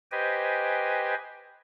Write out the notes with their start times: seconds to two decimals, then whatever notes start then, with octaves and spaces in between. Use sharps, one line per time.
0.12 G4 B4 C5 D#5 G5 G#5